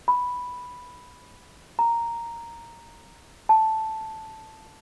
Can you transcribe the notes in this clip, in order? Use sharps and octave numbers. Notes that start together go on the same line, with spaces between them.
B5
A#5
A5